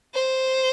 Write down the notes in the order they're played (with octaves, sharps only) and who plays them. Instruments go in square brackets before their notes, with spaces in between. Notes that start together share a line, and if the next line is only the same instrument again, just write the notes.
[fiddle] C5